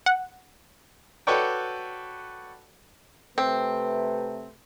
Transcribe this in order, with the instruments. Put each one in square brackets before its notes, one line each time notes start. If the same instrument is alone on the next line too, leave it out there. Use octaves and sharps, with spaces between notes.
[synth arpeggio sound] F#5
[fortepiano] F#4 A4 B4 C#5 D5 G5
[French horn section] C3 A3 B4 [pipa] C4